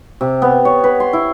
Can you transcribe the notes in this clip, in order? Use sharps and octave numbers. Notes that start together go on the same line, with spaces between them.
C3
B3
C#5
B4
C6
E4